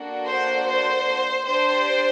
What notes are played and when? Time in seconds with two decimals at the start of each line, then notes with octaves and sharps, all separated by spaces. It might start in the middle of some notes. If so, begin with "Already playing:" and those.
Already playing: A#3 D4 F#4 A4
0.27 C5
0.67 C5
1.47 D4 G4 C5